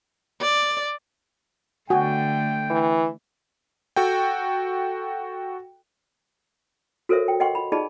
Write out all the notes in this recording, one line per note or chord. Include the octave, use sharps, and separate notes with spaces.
D5
D3 A3 F#4 G5 G#5
E3
F#4 A4 G5
F#4 A4 A#4 C5 C#5 E5
G5
D#5 F#5 G5 C6 C#6
B5
D#4 G#4 D5 D#5 A5 B5